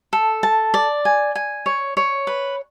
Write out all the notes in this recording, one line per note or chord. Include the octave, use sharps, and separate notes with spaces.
A4
A5
D5
G#5
G#5
C#5
C#5
B4